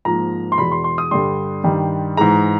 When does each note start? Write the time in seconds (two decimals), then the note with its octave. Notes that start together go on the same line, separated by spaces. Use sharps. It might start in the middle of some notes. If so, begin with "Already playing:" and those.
0.05 G#2 F3 A#3 A#5
0.52 C6
0.58 E2 B2 G#3 B5
0.72 C6
0.84 C6
0.98 D#6
1.11 G2 D3 G3 C6
1.64 G2 D#3 G3
2.17 G#2 E3 G#3 A#5